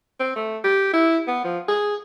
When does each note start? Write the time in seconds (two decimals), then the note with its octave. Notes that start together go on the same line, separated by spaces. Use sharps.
0.20 C4
0.36 A3
0.64 G4
0.94 E4
1.28 B3
1.44 F3
1.68 G#4